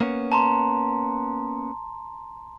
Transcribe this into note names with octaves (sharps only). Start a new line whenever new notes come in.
A#3 B3 C#4
A5 A#5 C6